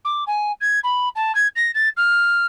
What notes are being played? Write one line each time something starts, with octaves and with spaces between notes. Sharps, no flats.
D6
G#5
G#6
B5
A5
G#6
A#6
A6
F6